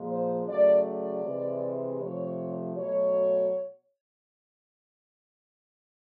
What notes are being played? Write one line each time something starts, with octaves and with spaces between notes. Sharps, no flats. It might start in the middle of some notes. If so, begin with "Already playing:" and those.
Already playing: A#2 F3 G#3
C5
C#3 F#3 A3 D5
D5
C3 E3 G#3
C3 F3 A3 C#5
B2 F#3 A3 C#5